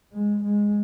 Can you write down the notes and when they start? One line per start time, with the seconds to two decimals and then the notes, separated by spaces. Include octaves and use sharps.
0.13 G#3
0.44 G#3